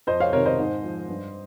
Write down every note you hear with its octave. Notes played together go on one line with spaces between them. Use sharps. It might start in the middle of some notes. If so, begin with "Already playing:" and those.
F2 C5 D#5
C#5 F5
C3 D#3 A#4 C#5
C5 D#5
G#2
F3
G2